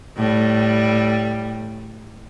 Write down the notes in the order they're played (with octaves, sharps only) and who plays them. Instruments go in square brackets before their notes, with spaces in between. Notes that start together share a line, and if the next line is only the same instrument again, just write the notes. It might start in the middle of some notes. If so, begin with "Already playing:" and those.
[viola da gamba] A2 G3